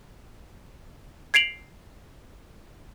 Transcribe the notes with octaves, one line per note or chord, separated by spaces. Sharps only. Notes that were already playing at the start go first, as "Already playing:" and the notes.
G#6 C7 D7 F7 F#7